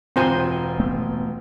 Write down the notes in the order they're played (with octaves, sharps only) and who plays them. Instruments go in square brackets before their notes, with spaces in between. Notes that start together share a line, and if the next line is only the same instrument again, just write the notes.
[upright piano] E1 F4 A#5 [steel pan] C4 C5 G#5
[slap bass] A3 B3